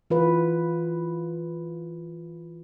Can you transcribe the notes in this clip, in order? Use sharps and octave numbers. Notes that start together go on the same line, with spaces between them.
E3 F4 B4